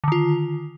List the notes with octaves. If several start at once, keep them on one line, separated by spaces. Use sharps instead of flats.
D3 D#3 F4